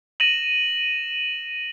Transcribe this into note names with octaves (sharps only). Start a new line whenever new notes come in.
A#6 D#7 E7 F#7